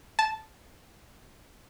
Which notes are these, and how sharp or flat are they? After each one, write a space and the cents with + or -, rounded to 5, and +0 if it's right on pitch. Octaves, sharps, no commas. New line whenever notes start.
A5 -10